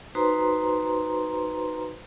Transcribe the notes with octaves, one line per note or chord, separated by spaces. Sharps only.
D#4 F#4 B4 C5 A#5 C6